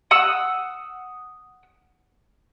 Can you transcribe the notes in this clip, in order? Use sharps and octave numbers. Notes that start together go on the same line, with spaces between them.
F#5 D#6 E6